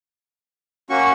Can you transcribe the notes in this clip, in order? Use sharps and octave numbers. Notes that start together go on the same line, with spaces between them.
A#3 C#4 F#4 C#6